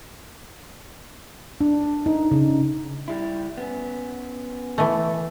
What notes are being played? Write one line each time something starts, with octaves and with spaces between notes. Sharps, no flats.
D4
D#4
C#3
G3 E4
B3 C#4
E3 A3